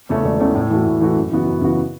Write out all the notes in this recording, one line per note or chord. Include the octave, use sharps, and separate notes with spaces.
E2 C#3 A3 C#4
E1
E2 C#3 A3 C#4
A2
E3 A3 F#4
A2
E3 A3 F#4
F#2
C#3 E3 B3 F#4
F#2
C#3 E3 B3 F#4